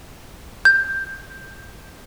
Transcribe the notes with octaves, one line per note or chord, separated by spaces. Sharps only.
G6